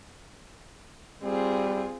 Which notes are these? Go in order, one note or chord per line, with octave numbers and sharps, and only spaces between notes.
G3 C4 F4 G#4